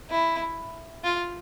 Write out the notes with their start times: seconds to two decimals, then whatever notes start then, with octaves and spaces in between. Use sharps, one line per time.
0.10 E4
1.04 F4